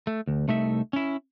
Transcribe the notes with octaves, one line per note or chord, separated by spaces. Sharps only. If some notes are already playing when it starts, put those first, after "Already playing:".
A3
D2
C2 A3 D#4 E5
C#4 E4